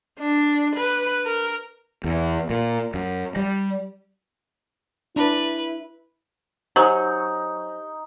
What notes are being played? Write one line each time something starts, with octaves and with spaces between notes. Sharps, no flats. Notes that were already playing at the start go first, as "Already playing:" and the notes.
D4
B4
A#4
E2
A#2
F#2
G3
D4 E4 B4
F#3 D#4 G4 C5 G#5